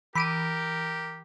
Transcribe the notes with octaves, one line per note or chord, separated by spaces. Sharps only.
E3 G4 A#4 B5 D6 D#7